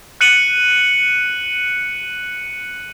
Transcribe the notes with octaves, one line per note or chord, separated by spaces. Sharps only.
F#6 C#7 D#7 F#7